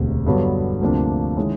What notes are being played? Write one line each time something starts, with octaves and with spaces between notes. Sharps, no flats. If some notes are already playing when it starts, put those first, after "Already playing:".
Already playing: E1 D2 C3
G2 D3 F#3 B3
D2 C3 F3 A#3 D4
D#3 G#3 C#4 E4